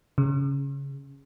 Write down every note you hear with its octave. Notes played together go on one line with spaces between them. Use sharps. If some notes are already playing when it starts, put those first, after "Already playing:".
C#3